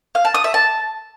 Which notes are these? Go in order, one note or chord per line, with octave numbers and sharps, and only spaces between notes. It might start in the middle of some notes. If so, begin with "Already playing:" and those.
F5
A5
D#6
E5
A5